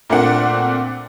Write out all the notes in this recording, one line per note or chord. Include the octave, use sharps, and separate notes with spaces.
A#2 A3 A#3 C4 D4 F#5